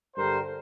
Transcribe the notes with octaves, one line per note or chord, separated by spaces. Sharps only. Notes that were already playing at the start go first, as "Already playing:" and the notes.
G2 D3 G3 A#4 C5